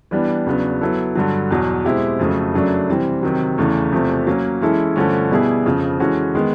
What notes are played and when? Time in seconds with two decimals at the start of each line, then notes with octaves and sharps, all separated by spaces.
0.11 E3 G3 B3 D4
0.46 E2 C#3 F#3 B3 D4
0.81 F#3 B3 E4 A4
1.15 G2 D3 F#3
1.50 E2 B2 F#3
1.84 B2 G#3 C4 E4 G4
2.19 F2 C#3 F#3 A3
2.54 F#2 C#3 F#3 A3 D4
2.89 C3 E3 G3 C4
3.23 C3 D#3 F#3
3.58 E2 C#3 E3 A3
3.92 E2 C3 F3 A3
4.27 F#3 A#3 C#4
4.62 E3 G#3 C#4 E4 A4
4.96 G2 D3 F3 A3 C#4
5.31 B2 G3 B3 E4 G#4
5.66 F2 C#3 F3
6.00 E3 G#3 C#4 F#4 A4
6.35 D#3 G#3 B3